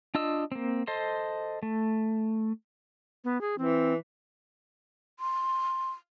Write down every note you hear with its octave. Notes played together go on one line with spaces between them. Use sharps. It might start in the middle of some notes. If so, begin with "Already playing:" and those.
D4 F4 D#5 E6
A#3 C4
A4 C5 D#5 C6
A3
B3
G#4
E3 C4
C6